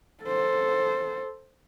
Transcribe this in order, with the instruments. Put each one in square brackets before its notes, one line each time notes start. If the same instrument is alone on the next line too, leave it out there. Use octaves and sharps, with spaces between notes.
[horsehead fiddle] A4 C5